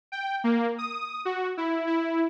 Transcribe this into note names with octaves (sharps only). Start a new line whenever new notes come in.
G5
A#3
D#6
F#4
E4
E4